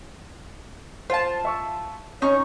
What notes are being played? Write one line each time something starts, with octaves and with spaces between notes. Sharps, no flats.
F4 C5 F5 A5
E5 C#6 E6
C#4 D#4 C#5 A#5 C#6